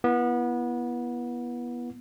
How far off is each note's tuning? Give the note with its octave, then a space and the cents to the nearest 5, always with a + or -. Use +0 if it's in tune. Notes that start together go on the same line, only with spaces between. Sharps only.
B3 -25 E4 +20